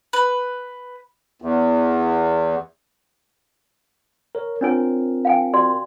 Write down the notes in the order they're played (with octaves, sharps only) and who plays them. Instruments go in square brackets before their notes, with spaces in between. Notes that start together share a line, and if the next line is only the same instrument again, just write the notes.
[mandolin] B4
[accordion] E2
[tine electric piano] A#4 C#5
[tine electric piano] C4 F4 A#4 [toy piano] D4 C#5 G#5
[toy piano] F5 G5 G#5
F#4 D5 C6